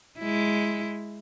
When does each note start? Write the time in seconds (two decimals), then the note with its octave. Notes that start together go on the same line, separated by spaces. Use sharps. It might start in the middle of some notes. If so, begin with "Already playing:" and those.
0.18 G#3 E4